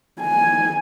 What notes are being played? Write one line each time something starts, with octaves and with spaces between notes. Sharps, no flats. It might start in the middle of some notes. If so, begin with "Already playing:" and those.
G#5